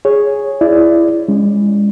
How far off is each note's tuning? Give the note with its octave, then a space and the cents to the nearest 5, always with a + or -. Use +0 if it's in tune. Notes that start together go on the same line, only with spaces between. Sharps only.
G#4 +0 C#5 +0
E4 +20 D5 +5
G#3 -25 C#4 +0